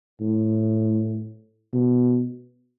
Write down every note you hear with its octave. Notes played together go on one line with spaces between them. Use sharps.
A2
B2